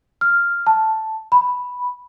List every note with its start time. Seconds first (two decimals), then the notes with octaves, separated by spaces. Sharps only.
0.21 F6
0.67 A5
1.32 B5